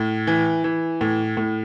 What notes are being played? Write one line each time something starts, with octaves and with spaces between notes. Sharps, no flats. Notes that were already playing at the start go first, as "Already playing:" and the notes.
Already playing: A2
E3
E3
A2
A2